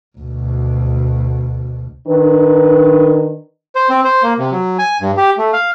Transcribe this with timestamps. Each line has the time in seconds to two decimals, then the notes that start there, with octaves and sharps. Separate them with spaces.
0.18 D2 B2
2.08 D#3 D4 B4
3.75 C5
3.90 C4
4.04 C5
4.23 A#3
4.39 C3
4.52 F#3
4.79 G#5
5.01 G2
5.17 G4
5.38 A3
5.53 F5